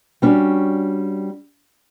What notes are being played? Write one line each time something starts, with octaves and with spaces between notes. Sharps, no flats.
G3 C#4 D4 F#4